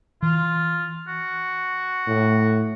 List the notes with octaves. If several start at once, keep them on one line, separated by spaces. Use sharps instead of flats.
E3 F4
F#4
A2